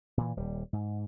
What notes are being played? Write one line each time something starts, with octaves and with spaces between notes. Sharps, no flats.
A#2 E3
D#1 G3
G#2